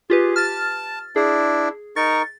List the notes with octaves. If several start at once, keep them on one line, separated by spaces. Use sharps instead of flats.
F4 G4 G#4 B4
A5 F6 A6
D4 E4 G#4
D#4 A#4 C#6 A6